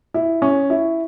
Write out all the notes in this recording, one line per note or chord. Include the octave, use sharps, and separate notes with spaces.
E4
C#4
E4